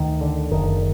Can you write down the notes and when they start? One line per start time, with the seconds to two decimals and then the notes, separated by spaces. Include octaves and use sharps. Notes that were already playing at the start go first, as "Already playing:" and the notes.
Already playing: D2 D#3
0.21 D3
0.51 F#1 D#3